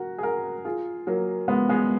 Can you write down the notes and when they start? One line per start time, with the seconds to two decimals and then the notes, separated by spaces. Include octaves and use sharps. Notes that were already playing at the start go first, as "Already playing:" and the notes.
Already playing: F#4 A#4
0.18 G#4
0.23 F#4 A#4
0.65 F4 G#4
1.07 F#3 A#3
1.48 G#3 B3
1.69 G#3 B3